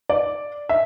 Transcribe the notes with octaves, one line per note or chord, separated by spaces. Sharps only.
D5
E5